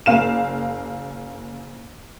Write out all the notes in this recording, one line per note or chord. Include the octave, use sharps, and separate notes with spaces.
F#1 A#3 F5 E7